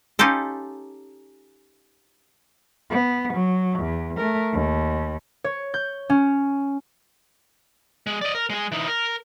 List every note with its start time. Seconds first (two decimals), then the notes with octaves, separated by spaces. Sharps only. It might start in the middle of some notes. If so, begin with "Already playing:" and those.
0.19 C#4 D#4 F4 G4 A4
2.90 B3
3.33 F#3
3.79 E2
4.17 A3 A#4
4.53 D#2
5.44 C#5
5.74 G6
6.10 C#4
8.07 G#3
8.22 D5 D#5
8.35 A#4
8.50 G#3 G#4
8.72 E3 D#4
8.88 A#4